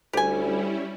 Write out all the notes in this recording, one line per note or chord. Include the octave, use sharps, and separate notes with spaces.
D2 G3 C#4 E4 G4 G#5